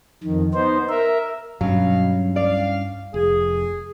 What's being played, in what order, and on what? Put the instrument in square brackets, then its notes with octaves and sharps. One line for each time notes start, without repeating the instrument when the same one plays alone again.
[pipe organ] F2 D#3
B3 D#4 C5
A#4 E5
[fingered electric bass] G2 C#4 [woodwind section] B2 F5 [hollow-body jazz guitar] F#3
[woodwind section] C2 F5 [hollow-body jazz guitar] D5
[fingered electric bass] F1 [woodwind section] G#4